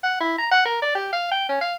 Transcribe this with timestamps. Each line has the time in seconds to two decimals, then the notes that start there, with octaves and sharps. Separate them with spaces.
0.03 F#5
0.21 E4
0.38 A#5
0.51 F#5
0.66 A#4
0.82 D5
0.95 G4
1.13 F5
1.31 G5
1.49 C#4
1.61 F5